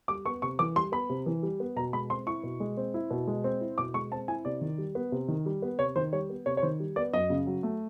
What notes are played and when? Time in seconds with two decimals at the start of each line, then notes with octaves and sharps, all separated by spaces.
0.08 G3 D6
0.26 B3 C#6
0.42 C3 C#6
0.59 E3 D6
0.76 G3 C6
0.92 B3 B5
1.10 C3
1.26 E3
1.43 G3
1.60 B3
1.76 B2 A#5
1.93 G#3 B5
2.10 C4 C6
2.27 E4 C#6
2.43 B2
2.60 G#3
2.77 C4
2.94 E4
3.11 B2
3.28 G#3
3.44 C4
3.61 E4
3.78 B2 D6
3.94 G#3 C#6
4.11 C4 A5
4.28 E4 G#5
4.45 C3 D5
4.61 D#3
4.78 G3
4.95 B3
5.12 C3
5.28 D#3
5.46 G3
5.62 B3
5.79 C3 C#5
5.96 D#3 C5
6.13 G3 C#5
6.30 B3
6.46 C3 C#5
6.57 C#5
6.62 D#3 C5
6.80 G3
6.96 B3 D5
7.13 F#2 D#5
7.30 C#3
7.47 F#3
7.63 A3